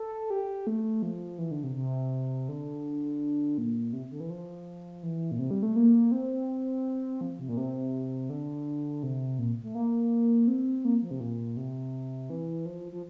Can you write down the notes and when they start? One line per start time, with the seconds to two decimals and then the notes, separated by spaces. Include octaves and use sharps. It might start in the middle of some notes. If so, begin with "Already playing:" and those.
Already playing: A4
0.30 G4
0.67 A3
1.02 F3
1.38 E3
1.51 D3
1.64 C3
1.76 C3
2.49 D3
3.58 A#2
3.93 C3
4.11 D3
4.20 E3
4.30 F3
5.03 E3
5.31 A#2
5.39 C3
5.51 G3
5.63 A3
5.76 A#3
6.12 C4
7.21 F3
7.39 C3
7.49 A#2
7.57 C3
8.30 D3
9.03 C3
9.39 A#2
9.63 A3
9.75 A#3
10.48 C4
10.85 A#3
11.02 F3
11.11 C3
11.20 A#2
11.57 C3
12.30 E3
12.66 F3
12.92 F3